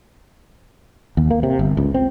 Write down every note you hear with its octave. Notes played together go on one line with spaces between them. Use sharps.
D#2
A#3
C3
G1
C#2
C4